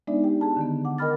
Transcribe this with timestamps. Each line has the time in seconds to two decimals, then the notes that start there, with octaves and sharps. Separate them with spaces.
0.07 G#3 B3 D4 D#4 D5 E5
0.24 G4 G5
0.40 G#4 A5 A#5
0.57 D3 D#3 B3
0.85 F#5 D6
0.98 A#4 D#5 G5 B5 F6 A6